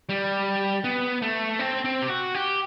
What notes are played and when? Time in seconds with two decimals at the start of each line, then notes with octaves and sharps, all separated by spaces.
0.09 G3
0.84 B3
1.22 A3
1.59 C4
1.84 C4
2.02 G4
2.09 F#4
2.35 G4